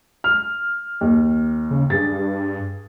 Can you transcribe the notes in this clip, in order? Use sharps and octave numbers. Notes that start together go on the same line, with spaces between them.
F6
D#2
C#3
G2 G#4 A6